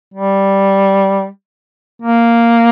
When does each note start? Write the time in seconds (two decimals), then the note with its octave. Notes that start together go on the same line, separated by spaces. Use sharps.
0.14 G3
2.02 A#3